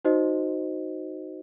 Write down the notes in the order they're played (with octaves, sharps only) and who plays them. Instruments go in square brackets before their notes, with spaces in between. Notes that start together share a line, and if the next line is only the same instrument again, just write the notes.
[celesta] D#4 F#4 C5 D#5